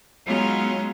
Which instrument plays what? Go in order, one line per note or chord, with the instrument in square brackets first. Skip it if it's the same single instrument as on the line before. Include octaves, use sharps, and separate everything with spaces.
[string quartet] F#3 G#3 B3 C#4 D#4 F4